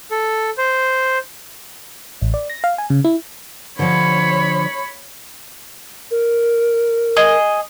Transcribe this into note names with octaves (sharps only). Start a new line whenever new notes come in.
A4
C5
A1
D5
A#6
F5
G#5
C#3
E4
D3 F3 C#5 B5
A#4
G#4 D#5